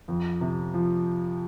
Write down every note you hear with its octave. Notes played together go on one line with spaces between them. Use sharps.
F2
C3
F3